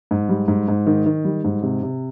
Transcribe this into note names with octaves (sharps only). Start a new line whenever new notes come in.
G#2
G3
G#2
G#2
D#3
D#3
G3
G#2
C3
C3